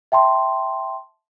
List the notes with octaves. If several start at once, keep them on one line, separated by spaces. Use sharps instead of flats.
E5 G5 A5 C6